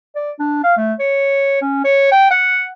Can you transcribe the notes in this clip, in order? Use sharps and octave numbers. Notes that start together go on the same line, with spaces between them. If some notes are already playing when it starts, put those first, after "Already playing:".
D5
D4
F5
A3
C#5
C#4
C#5
G5
F#5